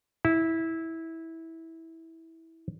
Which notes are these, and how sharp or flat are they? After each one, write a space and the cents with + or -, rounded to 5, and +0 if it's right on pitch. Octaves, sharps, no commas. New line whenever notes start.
E4 -15